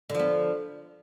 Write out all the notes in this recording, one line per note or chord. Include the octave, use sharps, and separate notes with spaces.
D3 F3 B3